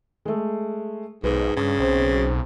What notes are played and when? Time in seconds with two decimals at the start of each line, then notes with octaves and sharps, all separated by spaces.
0.25 G#3 A3
1.24 B1 G#2 B4
1.56 G2 C#3
1.79 B1 C4 C5